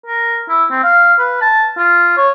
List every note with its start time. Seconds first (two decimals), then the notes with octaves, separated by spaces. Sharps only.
0.06 A#4
0.49 E4
0.71 C4
0.83 F5
1.19 B4
1.41 A5
1.78 F4
2.17 C#5